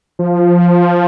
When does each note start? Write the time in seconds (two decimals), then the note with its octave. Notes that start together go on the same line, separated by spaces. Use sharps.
0.19 F3